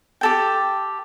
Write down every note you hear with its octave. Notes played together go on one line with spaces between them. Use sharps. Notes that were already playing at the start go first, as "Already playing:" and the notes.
G4 A4 G5